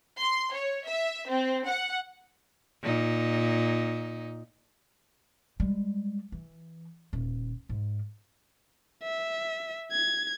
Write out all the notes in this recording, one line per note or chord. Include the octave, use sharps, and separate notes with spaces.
C6
C#5
E5
C4
F#5
A#2 D#4
G3 G#3
E3
D#1
G#2
E5
G#6